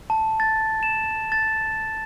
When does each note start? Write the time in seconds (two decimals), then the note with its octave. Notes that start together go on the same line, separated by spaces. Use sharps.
0.10 A5
0.40 A6
0.83 E7
1.32 A6